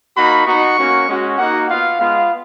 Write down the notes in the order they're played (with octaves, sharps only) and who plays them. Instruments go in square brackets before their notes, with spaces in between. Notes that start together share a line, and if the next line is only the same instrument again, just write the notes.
[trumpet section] A#3 D#4 F#4 B5
B3 D#4 F#4 C#6
A#3 C#4 F#4
G#3 C#4 F#4
A#3 D#4 F#4 F#5
B3 F4 F5
G#3 B3 F4 F5